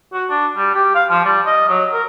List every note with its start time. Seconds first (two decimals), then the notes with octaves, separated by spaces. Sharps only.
0.13 F#4
0.29 D4
0.56 G3
0.75 G4
0.95 F5
1.10 F3
1.25 G3
1.46 D#5
1.69 F#3
1.92 A#4